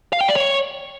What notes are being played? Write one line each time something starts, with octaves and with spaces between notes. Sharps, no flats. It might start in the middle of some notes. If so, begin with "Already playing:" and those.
F5
G5
D5
C#5